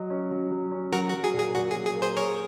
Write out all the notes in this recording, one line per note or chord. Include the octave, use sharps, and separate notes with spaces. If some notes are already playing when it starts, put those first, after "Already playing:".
Already playing: F#3 D#5
C#4
F#3
F#3
C#4
F#3 F#4 A#4
F#4
F#3
G#4
A#2
G#4
A#2 F#4
G#4
F#3
G#4
A#3
G#4 C5
G#4 A#4 C#5